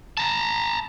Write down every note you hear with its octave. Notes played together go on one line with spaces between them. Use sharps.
A5 A#5